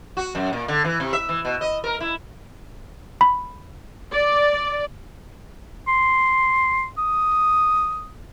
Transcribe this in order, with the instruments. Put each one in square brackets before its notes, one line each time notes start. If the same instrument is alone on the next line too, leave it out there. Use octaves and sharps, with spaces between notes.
[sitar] F#4
F#2
A#2
D3
E3
C3
E5
E3
B2
D#5
A#4
E4
[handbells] B5
[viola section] D5
[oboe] C6
D#6